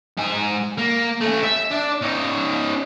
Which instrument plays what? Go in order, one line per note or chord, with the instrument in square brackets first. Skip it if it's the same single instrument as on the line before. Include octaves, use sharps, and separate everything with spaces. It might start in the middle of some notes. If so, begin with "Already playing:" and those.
[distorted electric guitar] G#2 G#5
A#3
A3 C#4
E5
D4
C#4 D#4